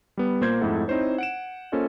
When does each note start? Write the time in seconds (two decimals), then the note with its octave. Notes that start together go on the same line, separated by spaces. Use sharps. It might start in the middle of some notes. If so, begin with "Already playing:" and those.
0.17 G3 B3
0.41 A#2 A#3 C5 C6 G6 G#6
0.61 F2 G#2 A3 E4 A4 F#5
0.88 C4 D#4 E4 C5 C#5
1.18 F#5 D7 E7
1.72 A#3 C#4 F4 A4 C5 D#5